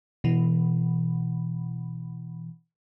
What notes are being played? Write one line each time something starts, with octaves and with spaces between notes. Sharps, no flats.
B2 E3